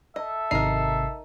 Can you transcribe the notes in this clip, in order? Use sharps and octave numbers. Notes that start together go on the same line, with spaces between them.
A4 D#5 E5
G#1 C3 D#4 A#4 C7